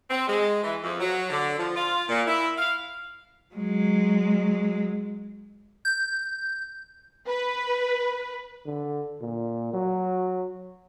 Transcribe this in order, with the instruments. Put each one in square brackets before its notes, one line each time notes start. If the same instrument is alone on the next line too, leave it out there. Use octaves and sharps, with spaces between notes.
[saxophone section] C4
G#3
E3
F2
F#3
D3
F3
F4
A#2
E4
F5
[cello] F#3 G#3
[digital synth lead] G6
[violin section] B4
[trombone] D3
A#2
F#3